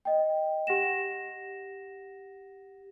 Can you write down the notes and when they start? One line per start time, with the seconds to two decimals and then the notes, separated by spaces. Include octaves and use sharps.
0.05 D#5 G5
0.67 G4 F#5 A#6 E7